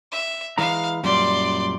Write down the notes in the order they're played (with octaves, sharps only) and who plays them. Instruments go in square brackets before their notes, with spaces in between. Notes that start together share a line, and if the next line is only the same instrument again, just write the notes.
[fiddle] E5
[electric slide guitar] E3 G#3 A#5 [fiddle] F5
[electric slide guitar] F#2 A#2 G3 [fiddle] D5 C6